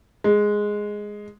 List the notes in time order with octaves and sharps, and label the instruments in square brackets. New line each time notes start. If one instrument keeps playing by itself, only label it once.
[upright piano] G#3